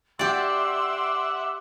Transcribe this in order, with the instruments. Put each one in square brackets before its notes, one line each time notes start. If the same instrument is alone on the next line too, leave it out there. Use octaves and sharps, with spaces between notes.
[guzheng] G4 D5 [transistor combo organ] E5 F#5 [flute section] C6 D6 E6